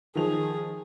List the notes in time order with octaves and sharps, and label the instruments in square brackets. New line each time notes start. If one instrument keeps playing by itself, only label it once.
[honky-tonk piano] D#3 F3 F7 [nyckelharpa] G#4